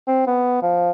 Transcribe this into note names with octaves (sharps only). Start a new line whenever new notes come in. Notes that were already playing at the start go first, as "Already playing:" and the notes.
C4
B3
F3